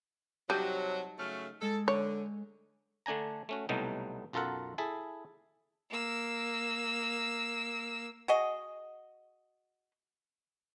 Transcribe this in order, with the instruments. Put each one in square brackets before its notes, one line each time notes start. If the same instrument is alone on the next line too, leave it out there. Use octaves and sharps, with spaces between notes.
[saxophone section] C3 F#3 [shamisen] G3 [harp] D#4 A5
[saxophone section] C#3 F#3 A3 [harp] F6
[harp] G#3 [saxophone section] A4
[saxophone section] D3 [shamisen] C#5
[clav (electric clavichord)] D3 A3 D4 G#5 A#5
A3 C#4 F#4
C2 B2 F#3 G3 A3 D#4
B1 F#2 F4 A4 A#4 F#5
E4 G#4 A4 E5
[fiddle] A#3 E6
[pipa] F#4 G#4 D#5